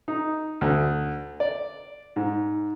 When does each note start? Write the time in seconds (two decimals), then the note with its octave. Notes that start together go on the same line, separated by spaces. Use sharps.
0.08 D#4
0.61 D2
1.40 D5
2.16 G#2